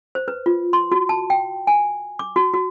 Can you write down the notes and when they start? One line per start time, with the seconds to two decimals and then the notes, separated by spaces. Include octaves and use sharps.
0.15 C5
0.28 B4
0.46 F4
0.73 C6
0.92 F#4
1.09 A5
1.30 G5
1.67 G#5
2.19 D6
2.36 F#4
2.54 F#4